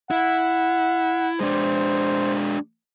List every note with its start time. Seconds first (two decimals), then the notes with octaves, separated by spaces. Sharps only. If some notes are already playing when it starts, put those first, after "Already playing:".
0.11 E4 F#5
1.40 G#3 D4 C5